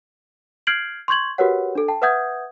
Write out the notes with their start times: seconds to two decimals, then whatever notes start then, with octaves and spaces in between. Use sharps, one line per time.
0.67 F6 G6 G#6 C7 D7 F#7
1.08 C6 C#6 G6 G#6 F#7
1.38 F#4 G4 A#4 B4 C#5 F#5
1.75 D4 A4
1.88 G5 A5
2.02 B4 E5 F#5 D#6 G6 G#6